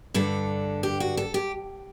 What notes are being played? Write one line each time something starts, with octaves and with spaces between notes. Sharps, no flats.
G2 D3 A4
G4
F#4
A4
G4